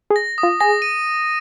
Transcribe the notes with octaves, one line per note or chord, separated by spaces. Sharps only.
G#4
A#6
D#6
F4
G#4 A#6
D#7